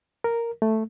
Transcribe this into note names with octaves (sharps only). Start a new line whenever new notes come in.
A#4
A3